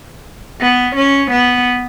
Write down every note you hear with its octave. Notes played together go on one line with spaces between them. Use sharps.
B3
C#4
B3